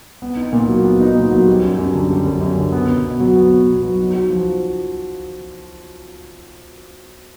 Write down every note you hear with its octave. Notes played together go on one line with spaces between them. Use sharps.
B3
D#4
A#2
F#3
B3
D#4
A#2
F#3
G3
F#2
F#2
D3
G3
F#2
F#2
D3
B3
B2
B2
F#3
B3
B2
B2
F#3
D#4
F#4
F3